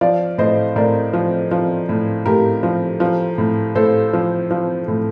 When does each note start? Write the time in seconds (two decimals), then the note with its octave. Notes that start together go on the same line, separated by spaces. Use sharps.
0.01 F3 D5 F5
0.38 A2 C5 D#5
0.76 A2 A#4 D5
1.13 F3
1.51 F3
1.89 A2
2.26 A2 G4 A#4
2.63 F3
3.00 F3
3.38 A2
3.75 A2 A4 C5
4.13 F3
4.51 F3
4.88 A2